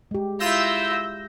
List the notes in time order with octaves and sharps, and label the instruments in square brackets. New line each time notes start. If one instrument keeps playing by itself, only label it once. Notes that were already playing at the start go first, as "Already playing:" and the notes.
[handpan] G#3 G4
[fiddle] E4 F4 [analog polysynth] E6 G6 A#6